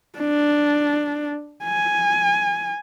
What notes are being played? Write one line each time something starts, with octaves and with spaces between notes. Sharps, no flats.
D4
G#5